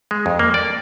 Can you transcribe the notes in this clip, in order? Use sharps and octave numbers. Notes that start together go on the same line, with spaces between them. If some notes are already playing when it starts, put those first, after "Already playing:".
G#3
F2
A#3
D5